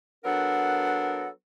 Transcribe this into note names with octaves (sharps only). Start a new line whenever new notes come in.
F#3 B3 D4 A4 A#4 F#5